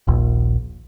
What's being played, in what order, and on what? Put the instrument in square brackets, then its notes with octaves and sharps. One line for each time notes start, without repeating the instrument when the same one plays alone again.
[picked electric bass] D#1 A#1